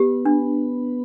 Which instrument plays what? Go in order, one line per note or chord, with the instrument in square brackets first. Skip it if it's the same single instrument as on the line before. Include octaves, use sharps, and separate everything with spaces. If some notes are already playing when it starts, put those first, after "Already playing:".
Already playing: [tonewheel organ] B3 [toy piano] G4
[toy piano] D4